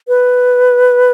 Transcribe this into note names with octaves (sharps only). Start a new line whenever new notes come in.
B4